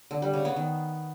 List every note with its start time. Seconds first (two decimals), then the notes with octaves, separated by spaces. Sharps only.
0.11 D3
0.22 G3
0.34 C#3
0.45 B3
0.56 D#3